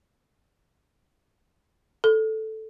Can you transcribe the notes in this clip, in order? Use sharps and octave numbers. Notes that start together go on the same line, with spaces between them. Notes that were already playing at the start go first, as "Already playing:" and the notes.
A4